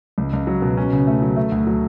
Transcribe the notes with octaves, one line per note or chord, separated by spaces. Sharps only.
C#2
C#2
F#3
B2
C#4
C#3
A3
F#3
A3
D2
F#3